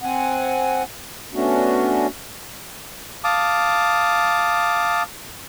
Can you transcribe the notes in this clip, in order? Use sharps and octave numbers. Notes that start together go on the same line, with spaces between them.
C4 F#5 G#5
A3 B3 C#4 D4 F#4
F5 A5 D6 D#6